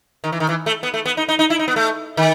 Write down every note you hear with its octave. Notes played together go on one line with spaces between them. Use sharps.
D#3
E3
D#3
E3
A3
B3
A3
B3
D#4
D#4
D#4
E4
D#4
B3
A3
D#3